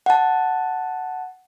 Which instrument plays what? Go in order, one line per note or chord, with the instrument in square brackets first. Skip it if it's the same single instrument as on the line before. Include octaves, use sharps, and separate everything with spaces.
[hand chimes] F#5 A5